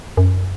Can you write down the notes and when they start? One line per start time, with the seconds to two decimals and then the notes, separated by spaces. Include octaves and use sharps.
0.17 F#2